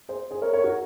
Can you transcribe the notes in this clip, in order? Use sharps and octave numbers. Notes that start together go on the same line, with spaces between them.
G#4 C5
G#4 C5
A#4 C#5
A#4 C#5
F#4 A#4